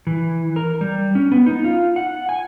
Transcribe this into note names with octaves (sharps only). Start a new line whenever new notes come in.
E3
A#4
G3
C#4
B3
D#4
F4
F#5
G#5